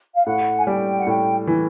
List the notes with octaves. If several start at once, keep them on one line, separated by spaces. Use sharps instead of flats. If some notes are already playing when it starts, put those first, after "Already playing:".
F5
A2 F#5
G#5
G3 G5
F#5
A2 G5
E3